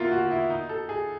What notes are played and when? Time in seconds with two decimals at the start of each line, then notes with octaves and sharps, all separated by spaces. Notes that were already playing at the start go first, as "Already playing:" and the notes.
Already playing: A#3 B3 E4 F4
0.12 F#4
0.31 E4
0.50 D#4
0.69 A4
0.89 G#4